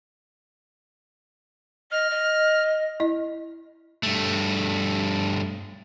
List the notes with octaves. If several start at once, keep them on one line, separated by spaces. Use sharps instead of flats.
D#5 F6
D#5
E4 D#5
G2 A3